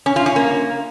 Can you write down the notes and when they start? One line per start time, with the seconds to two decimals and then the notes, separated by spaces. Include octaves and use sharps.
0.06 C#4
0.16 F4
0.26 C#4
0.36 A#3